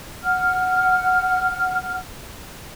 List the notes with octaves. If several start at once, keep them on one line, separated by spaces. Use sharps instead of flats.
F#5 F6